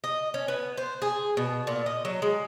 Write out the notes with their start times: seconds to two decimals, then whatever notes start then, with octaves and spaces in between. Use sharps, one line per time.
0.04 D#5
0.34 C#4
0.48 B3
0.77 C5
1.02 G#4
1.37 B2
1.67 A#2
1.86 D#5
2.05 F#3
2.22 G#3